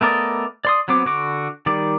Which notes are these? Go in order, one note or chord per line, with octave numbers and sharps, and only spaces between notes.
A3 B3 A#4 D5 D#5
D5 C6 D#6
F#3 B3 C4 D6
D3 F#4 D6
D#3 G3 D5